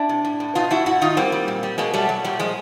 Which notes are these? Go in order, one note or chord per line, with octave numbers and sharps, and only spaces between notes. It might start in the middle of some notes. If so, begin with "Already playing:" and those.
Already playing: D4 E4
C3
A2
A2
B2 D#4 F4
B2 E4 F#4
G#2 E4 F#4
D#3 D#4 F4
G3 A#3 C4
G3
A#2
G3
B2 G#3 A#3
F#3 G3 A3
F#3
A#2 G3
F3 G#3